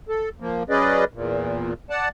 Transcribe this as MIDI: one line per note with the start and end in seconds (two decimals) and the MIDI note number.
0.09 0.29 69
0.40 0.63 53
0.40 0.63 58
0.70 1.04 54
0.70 1.04 61
0.70 1.04 68
0.70 1.04 71
0.70 1.04 74
0.70 1.04 75
1.14 1.73 40
1.14 1.73 46
1.90 2.09 74
1.90 2.09 78
1.90 2.09 81